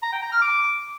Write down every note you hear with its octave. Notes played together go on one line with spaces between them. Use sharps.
A#5
G5
A#5
F6
D6